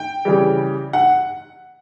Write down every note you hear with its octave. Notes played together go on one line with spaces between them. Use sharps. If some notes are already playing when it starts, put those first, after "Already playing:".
Already playing: G5
C#3 E3 G3
F#5